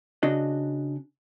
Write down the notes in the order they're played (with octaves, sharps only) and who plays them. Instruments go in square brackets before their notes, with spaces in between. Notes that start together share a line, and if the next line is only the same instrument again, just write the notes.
[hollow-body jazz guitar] C#3 D4 F#4 D#5